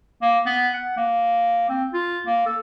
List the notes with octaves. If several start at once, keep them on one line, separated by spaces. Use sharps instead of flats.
A#3
B3
F#5
A#3
C4
F4
A#3
A4